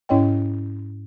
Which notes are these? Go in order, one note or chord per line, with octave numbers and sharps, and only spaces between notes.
G#2 C#4 E4 C#5 D#5 G5